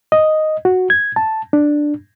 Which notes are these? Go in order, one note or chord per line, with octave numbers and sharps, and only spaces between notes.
D#5
F#4
G#6
A5
D4